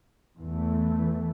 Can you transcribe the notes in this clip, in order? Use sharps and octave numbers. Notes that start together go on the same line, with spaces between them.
E2 E3 A3